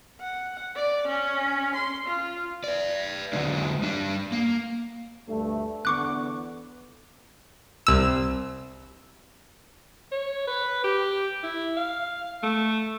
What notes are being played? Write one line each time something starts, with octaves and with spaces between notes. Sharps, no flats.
F#5
D5
C#4
C6
F4
B4 D5
D3 F#3 G#3 D4
G3 D4
A#3
D2 G2 A3
E2 D3 B3 C#6 D6 F#6
C2 E6
C#5
B4
G4
E4
F5
A3